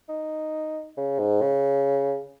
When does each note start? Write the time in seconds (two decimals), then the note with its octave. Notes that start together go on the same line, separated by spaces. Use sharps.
0.09 D#4
0.97 C#3
1.19 G#2
1.42 C#3